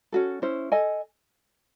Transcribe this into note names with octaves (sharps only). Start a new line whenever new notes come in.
C#4 F#4 A4
C#4 E4 C5
A4 D#5 G#5